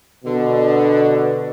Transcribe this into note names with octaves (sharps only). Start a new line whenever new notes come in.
B2 D3